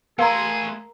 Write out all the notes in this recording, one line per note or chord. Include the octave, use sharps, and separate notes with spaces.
A3 G#4 A#4 F5 A#5 C6